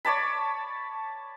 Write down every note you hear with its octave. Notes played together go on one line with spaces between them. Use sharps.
C#5 D5 A5 B5